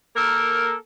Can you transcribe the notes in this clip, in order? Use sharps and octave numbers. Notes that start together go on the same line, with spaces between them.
A#3 A4 A#4